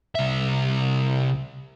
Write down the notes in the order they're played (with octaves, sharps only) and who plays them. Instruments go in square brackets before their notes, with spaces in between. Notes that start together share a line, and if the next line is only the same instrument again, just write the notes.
[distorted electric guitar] C2 E5